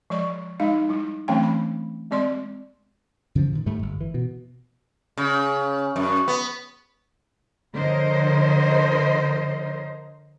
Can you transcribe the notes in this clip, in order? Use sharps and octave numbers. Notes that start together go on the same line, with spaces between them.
F3 G#3 D5 C#6
G#3 D#4 F5
G3 E4
E3 F#3 A3 C4 C#4 G5
B5
G#3 C4 D5 C6
C#3 E3 F3
A2 D#3
G#2 G3 A3
G1
E3
B2
C#3
F#2
B3
D3 F3 A#4 C5 C#5 D#5